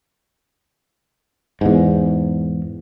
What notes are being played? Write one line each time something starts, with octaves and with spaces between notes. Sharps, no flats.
E2 G#2